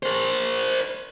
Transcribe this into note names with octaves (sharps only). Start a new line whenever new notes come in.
A#4 C5